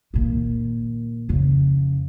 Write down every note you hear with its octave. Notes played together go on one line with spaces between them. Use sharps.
A#2 D#3
F2 C#3